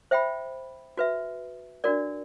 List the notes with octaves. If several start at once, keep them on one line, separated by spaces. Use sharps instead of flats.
C5 E5 G5 B5
F#4 B4 E5
D4 F#4 A#4 D5